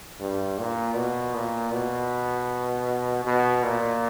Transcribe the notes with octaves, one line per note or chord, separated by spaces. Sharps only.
G2
A#2
B2
A#2
B2
B2
A#2